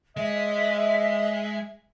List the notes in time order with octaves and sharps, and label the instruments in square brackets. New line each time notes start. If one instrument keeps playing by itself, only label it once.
[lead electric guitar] G#3 [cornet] D#5 [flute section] E5